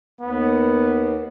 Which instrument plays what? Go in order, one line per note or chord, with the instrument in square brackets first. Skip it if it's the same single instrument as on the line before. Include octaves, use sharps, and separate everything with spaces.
[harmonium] D#2 [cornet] B3